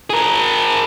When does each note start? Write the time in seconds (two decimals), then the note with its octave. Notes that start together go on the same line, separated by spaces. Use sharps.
0.10 G#4 A#4